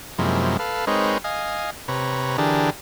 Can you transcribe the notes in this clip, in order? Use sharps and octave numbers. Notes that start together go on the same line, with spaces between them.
F#2 C3 F3 G#3 A#3 E4
A4 B4 F5
G#3 C4 D#4 A#4 B4 C#5
D#5 F5 G#5
C3 B4 C#5 A#5
D3 E3 D4 G4 G#4 A#4